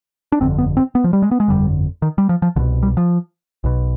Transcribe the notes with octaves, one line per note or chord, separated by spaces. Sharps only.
D4
G1 F2 D3 C4
B3
C4
B3
F3
G3
G#3
B3
G#3
G1 F2 D3 G3
D#3
G3
F3
F3
C2 B2 D3
G3
F3
B1 B2